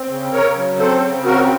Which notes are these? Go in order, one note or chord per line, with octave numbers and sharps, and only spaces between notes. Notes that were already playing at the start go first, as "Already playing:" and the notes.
Already playing: C4
C#3
C#3 A#4 C#5
F#3
C4 A4 C5
C#3
C4 F#4 A#4